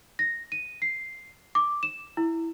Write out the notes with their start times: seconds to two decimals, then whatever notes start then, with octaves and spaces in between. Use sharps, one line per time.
0.19 A#6
0.52 D#7
0.82 C7
1.55 D6
1.83 E7
2.17 E4